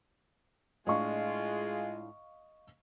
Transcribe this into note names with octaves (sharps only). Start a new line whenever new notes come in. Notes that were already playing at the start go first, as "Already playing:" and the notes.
A2 G#3 D4 F4 D#5 F5 C#6